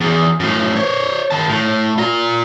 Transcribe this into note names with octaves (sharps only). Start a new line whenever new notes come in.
E2
F#2 A2
C5 C#5
D#3 A5
A2
F4 A#5